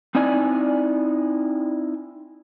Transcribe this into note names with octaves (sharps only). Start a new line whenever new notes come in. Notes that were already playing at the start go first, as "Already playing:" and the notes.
C4 D#4 E4 D5 G#5